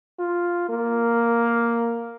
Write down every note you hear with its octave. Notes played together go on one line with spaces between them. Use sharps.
F4
A#3